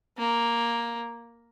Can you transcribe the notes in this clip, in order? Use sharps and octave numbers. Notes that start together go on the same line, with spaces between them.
A#3